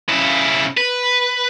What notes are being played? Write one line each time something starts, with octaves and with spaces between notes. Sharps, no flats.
C#3 E4
B4